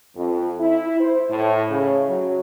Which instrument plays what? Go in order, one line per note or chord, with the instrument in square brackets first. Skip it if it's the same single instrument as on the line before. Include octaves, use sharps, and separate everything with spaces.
[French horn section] F2
E4
C5
A2
C#3
F#3